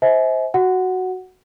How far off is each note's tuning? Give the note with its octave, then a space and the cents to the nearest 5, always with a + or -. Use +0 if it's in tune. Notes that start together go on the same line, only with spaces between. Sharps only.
C5 +0 E5 -40 G#5 +35
F#4 +0 F#5 +0